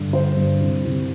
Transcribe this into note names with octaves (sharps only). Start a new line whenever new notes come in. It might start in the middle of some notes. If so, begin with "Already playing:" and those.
Already playing: G2 D3
D3 C5
G2
C2
C2